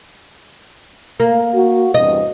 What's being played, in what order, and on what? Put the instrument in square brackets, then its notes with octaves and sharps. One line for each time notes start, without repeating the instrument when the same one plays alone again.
[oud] A#3
[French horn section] F#4
[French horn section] E2 G2 C3 [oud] D#5